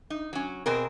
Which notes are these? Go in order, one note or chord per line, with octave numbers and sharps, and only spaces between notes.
D#4
F#3 C#4
B2 C4 G#4 A#4